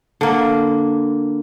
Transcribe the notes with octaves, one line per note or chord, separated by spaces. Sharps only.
D3 A#3